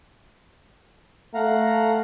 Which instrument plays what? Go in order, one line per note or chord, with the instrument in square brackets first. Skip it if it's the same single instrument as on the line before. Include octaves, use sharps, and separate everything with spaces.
[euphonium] A3 [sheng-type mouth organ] F5 F#5 A#5